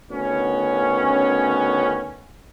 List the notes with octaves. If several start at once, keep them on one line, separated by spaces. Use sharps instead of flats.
D2 D#3 B3 C#4